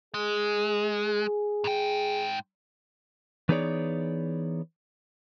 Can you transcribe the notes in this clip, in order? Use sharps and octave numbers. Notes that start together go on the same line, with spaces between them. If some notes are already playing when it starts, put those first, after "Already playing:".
G#3 G#4
G#2 G5
E3 B3 D#4 G#4 C#5 D5